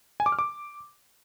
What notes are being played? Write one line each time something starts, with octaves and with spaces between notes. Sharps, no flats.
G#5
D6
F6
D6